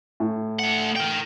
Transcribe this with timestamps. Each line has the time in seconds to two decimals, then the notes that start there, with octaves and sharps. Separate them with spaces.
0.20 A2
0.59 A3 F#5
0.96 A#4 G5